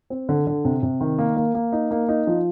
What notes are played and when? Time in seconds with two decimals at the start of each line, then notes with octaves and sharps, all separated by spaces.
0.10 C4
0.29 D3
0.47 D3
0.65 C3
0.83 C3
1.01 D#3
1.19 A#3
1.37 A#3
1.54 A#3
1.72 D#4
1.91 A#3
2.09 D#4
2.27 F3